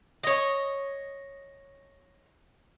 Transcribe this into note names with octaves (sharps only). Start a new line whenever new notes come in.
C#5 D#5